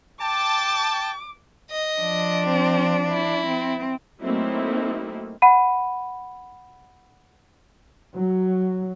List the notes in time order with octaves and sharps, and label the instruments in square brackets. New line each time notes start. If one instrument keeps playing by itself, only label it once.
[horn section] G5 A5 [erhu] D6
[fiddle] D#5
[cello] F3 D4
[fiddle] C4
E4
[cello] C4
[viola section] F#3 A3 A#3 C4 D#4 E4
[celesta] F#5 B5 D#7
[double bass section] F#3